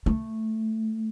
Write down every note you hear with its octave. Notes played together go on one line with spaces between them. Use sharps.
A3